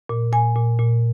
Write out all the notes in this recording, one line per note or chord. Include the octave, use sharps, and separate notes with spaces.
A#2
A#2 G#5
A#2
A#2